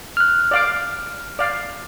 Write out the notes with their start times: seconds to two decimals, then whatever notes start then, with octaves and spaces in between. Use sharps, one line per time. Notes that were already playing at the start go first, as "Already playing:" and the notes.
0.17 F6 F#6
0.51 D5 F5 D6
1.39 D5 F5